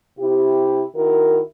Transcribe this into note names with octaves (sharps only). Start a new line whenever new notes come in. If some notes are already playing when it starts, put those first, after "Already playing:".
C3 E4 G4
D#3 E4 F#4 A#4